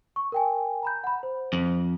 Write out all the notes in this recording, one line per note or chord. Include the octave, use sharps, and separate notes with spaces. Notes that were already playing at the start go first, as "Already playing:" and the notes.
C#6
A#4 G5 G#5
A#5 B5 G6
F#5 B5
C5
F2